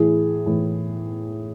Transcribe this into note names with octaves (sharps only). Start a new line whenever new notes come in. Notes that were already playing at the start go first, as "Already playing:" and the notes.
Already playing: A2 E3 G#4
A2 E3